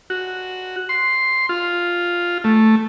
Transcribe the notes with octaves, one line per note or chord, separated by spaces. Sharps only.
F#4
C6
F4
A3